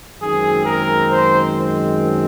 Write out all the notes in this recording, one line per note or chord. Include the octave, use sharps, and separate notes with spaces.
F#2 D#3 G#3 C4 G#4
A#4
C5